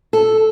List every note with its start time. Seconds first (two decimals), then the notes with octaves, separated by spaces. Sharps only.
0.13 A4